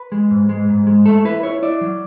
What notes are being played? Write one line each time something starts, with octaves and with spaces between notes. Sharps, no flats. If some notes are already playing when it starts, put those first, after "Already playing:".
Already playing: B4
G#3
G#2
G#3
G#2
G#3
A3 A4
E4 B4
E4 C#5
E4 D5
F#3